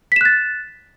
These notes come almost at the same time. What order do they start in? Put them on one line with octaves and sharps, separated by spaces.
B6 E7 F#6 A6